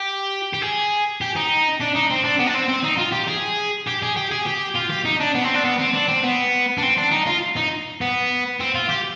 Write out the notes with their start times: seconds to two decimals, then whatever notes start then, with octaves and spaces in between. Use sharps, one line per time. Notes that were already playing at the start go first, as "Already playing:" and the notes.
Already playing: G4
0.54 G4
0.62 G#4
1.21 G4
1.36 D#4
1.80 D4
1.95 D#4
2.10 C4
2.24 D4
2.39 B3
2.47 D4
2.54 C4
2.69 C4
2.84 D#4
2.98 F4
3.13 G4
3.28 G#4
3.87 G4
4.02 G#4
4.16 G4
4.32 G#4
4.46 G4
4.76 F4
4.90 G4
5.05 D#4
5.20 D4
5.35 B3
5.44 C4
5.55 D4
5.64 B3
5.79 C4
5.94 D4
6.09 C4
6.23 B3
6.78 D4
6.83 C4
6.98 D4
7.12 D#4
7.27 F4
7.56 D#4
8.01 B3
8.60 C4
8.75 F4
8.89 G4